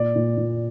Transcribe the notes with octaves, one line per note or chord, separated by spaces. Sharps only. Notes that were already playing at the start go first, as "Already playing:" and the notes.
Already playing: A#2 D5
A#2
A#2